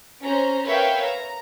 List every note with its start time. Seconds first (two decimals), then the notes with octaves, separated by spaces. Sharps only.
0.23 C#4 C5 A#5
0.67 A#4 B4 C#5 E5 F5 G5
1.08 A#5